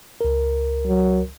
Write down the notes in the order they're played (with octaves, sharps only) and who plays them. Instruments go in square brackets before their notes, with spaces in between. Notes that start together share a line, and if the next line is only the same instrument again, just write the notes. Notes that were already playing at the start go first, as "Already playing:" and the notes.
[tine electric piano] C#2 A#4
[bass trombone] F#3